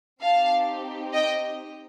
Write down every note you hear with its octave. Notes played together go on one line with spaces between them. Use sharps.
C4 D#4 G4 F5 A5
D#5 G5